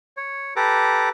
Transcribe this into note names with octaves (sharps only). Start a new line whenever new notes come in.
C#5
G4 A4 B4 A#5 D6